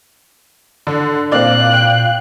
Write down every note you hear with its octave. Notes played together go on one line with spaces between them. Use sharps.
D3
A#2 A#3 C4 D5 F5 F#6
G5